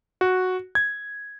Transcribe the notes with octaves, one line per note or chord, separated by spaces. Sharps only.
F#4
G#6